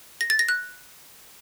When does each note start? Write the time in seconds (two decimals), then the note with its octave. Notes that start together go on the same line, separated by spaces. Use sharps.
0.21 A#6
0.30 A6
0.39 A#6
0.49 F#6